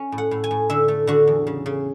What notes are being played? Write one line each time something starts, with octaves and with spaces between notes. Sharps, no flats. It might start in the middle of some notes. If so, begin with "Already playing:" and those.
Already playing: C#4
A2
F#5
A2
G#5
A2
D3 E5
A3
D3 F#4
E2
C#3
C#3